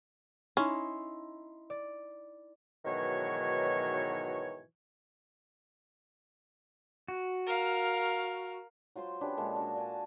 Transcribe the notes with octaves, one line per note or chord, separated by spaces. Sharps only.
C#4 D#4 E4 C6
D5
G#2 B2 D#3 E3 F#3 C#5
F#4
A#4 F5
F#3 F4 C5 C6
C#4 D4 G4 B4
A#2 F3 G#3 A4
D4 F4 F#4
D5 G#5 A5